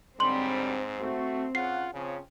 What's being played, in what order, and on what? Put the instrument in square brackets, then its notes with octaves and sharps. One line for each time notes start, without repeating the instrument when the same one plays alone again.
[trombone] G#2 [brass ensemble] D3 F#3 G3 [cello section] C4 [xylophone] C6 F#7
[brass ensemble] A3 F#4
[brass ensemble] C#3 F#5 [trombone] F4 [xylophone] C7
[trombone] C#3 [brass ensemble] F3 C4 C#4